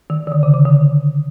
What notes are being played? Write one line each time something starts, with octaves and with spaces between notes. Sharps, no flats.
D#3
D#3
D3
C#3
C#3
D3